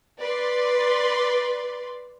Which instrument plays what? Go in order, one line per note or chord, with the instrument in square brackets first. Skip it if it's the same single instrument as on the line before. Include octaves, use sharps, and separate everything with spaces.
[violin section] B4 D5 C6